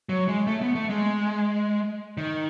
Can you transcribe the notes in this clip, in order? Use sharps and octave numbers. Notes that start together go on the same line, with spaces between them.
F#3
G#3
A3
B3
A3
G#3
D#3